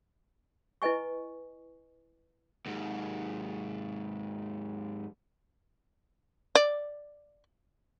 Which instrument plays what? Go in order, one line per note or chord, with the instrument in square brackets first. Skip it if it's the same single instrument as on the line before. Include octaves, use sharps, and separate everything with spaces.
[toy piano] E4 B4 D#5 G#5 C#6
[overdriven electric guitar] D#2 G#2
[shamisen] D5